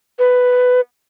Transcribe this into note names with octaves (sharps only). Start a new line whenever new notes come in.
B4